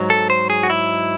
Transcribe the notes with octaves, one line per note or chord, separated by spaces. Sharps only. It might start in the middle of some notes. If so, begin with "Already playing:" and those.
Already playing: G#2 F#3
A4
C5
G#4
F#4
E4